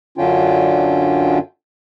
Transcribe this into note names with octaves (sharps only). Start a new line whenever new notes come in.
F#2 D3 C#4 D4 F4 G5